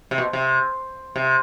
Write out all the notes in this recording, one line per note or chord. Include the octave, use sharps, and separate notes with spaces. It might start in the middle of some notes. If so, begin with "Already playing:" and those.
C3
B2
C3
C3